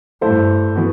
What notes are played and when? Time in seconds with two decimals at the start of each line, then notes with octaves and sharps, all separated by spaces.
0.21 G2 A3 E4 A4 C5
0.75 E3 B3 F#4